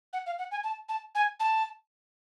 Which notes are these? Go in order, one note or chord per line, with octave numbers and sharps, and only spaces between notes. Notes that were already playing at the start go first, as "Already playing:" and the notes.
F#5
F5
F#5
G#5
A5
A5
G#5
A5